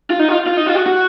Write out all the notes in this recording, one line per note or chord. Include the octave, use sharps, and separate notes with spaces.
F4
D#4
F4
F4
D#4
F4
F#4
F#4